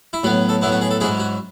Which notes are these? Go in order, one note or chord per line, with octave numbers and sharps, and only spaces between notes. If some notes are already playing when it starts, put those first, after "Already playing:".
E4
A2 F#3 B3 F#4
A4
A2 F#3 B3 E4
F#4
G#4
A4
G#2 F#3 C#4 E4 G#4
F#4